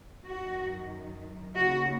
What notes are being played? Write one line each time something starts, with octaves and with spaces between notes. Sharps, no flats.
F#2 D#3 F#4
D#2 C#3 F#4